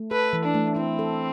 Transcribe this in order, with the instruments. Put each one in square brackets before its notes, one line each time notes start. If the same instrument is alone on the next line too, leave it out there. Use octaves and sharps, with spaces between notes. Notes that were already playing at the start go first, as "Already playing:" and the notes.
Already playing: [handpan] A3
[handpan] A4 [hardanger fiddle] B4
[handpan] E3
[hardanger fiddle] D4
[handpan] A3
[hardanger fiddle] C4 [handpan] E4
[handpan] A4